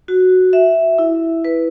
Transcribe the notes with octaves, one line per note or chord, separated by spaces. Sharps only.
F#4
E5
E4
B4